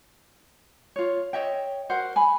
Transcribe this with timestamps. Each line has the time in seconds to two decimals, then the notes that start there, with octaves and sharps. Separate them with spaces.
0.96 F4 C#5
1.33 C#5 D#5 E5 G5
1.89 F#4 A#4 C5 F#5
2.16 G#5 B5